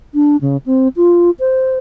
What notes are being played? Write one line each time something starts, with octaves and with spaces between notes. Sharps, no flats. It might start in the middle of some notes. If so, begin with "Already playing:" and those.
D4
C#3
C4
F4
C5